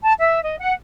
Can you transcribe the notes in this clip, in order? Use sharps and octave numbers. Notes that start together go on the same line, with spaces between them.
A5
E5
D#5
F#5